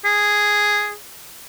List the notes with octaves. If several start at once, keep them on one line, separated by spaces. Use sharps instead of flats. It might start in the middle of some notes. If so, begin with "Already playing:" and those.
G#4